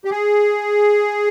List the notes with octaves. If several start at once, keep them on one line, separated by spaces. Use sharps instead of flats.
G4
G#4